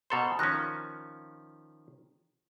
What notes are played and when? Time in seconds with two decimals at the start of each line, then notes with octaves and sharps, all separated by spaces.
0.10 B2 A4 C5 A#5 C6
0.39 D#3 F3 C#4 F#6 A#6